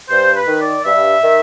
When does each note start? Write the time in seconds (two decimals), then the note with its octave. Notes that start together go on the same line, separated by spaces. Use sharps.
0.09 G2 C5
0.35 B4
0.47 D#3
0.60 D5
0.85 G2 E5
1.23 D#3